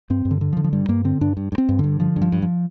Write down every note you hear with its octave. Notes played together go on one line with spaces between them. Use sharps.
G2 C4
G2
D3
D3
F3
D3
F3
G2 G3
G2 A#3
D3 C4
G2 D4
G2
G2
C4
G2
G2 D3
D3 F3
G2
F3
G2
F3